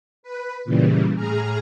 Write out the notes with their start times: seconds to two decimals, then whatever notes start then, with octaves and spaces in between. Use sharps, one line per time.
0.23 B4
0.65 A#2 C#3 E3 G3
1.15 A2 G#4 A#5 F6